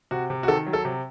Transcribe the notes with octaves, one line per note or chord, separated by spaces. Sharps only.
C3 F#4
C3
F#4
D#3 A4
F#3
A4
C3